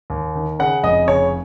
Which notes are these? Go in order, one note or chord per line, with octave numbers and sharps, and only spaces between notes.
D#2
D#3
C#3 F#5
F1 D#5
C#3 C#5